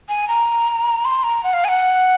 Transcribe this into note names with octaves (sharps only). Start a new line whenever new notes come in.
G#5
A#5
C6
A#5
F#5
F5
G#5
F#5